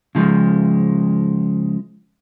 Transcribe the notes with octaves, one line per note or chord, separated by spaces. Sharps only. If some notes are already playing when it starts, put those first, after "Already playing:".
C#3 F3 G#3